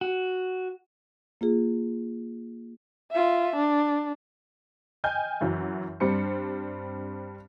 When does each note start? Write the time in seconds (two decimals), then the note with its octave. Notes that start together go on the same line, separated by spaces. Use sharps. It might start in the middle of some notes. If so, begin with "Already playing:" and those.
0.01 F#4
1.41 A#3 F4 G#4
3.11 F4 E5
3.56 D4
5.04 D#5 G5 G#5 F6 G6
5.41 F#2 E3 F#3
6.00 G2 G3 C4 D4 C5 C#7